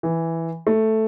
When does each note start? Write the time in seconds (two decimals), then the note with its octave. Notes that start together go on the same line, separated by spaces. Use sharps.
0.03 E3
0.67 A3